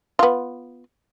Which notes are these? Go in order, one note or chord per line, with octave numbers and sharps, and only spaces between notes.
B3 F4